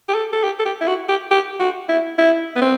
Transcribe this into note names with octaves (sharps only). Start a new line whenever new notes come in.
G4
A4
A4
G4
A4
G4
E4
F#4
G4
G4
F#4
E4
E4
B3
C4